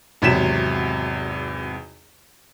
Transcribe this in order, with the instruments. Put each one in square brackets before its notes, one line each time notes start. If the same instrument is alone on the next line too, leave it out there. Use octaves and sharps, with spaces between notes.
[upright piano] G#1 E2 C3 F#3 B6 E7